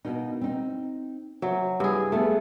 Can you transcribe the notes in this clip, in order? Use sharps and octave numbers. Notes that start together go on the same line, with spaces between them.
B2 A#3 D#4
C4 D#4
F#3 C5 E5
G2 E4 G#4
A3 B3 F4 G#4